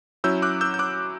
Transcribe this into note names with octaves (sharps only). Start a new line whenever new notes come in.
F#3 C#4 E4 E6 G6
D6 F#6
E6 G6
G6
D6 F#6